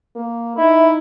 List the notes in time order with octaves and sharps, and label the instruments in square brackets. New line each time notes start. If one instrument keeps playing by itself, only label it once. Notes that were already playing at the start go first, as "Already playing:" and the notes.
[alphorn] A#3
[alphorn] D#4 [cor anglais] E4 [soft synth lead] E5